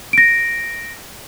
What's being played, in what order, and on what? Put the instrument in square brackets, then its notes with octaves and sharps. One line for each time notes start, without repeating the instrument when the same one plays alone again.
[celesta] A#6 D7